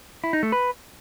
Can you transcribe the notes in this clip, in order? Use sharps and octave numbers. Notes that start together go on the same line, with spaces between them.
E4
D#4
A3
B4